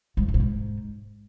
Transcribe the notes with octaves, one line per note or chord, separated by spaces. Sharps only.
G#2
F2
A2
A#2
G#2